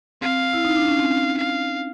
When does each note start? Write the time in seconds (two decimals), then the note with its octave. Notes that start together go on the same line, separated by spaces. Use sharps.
0.21 C4 F5
0.53 E4
0.65 D#4
0.76 D4
0.87 C#4
0.99 C4
1.38 F5